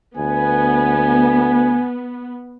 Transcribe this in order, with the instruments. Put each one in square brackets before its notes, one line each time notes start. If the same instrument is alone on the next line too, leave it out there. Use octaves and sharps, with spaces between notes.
[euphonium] D2 [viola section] B3 [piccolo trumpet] G#5